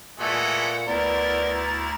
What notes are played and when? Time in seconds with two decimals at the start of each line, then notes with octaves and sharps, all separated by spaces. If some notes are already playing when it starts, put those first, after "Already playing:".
0.20 A#2 E3 G#3 A3 F#5
0.87 D2 B3 E4 A#4 D5 A6
1.56 A#5